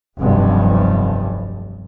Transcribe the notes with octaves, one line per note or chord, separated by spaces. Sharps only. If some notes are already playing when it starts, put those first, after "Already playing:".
F1 B1 G2